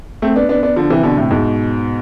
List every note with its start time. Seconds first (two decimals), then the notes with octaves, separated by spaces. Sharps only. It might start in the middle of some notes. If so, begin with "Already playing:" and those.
0.22 A3 C4
0.36 B3 D4
0.49 B3 D4
0.63 B3 D4
0.76 D3 F3
0.90 C3 E3
1.03 B2 D3
1.17 A2 C3
1.31 G#2 B2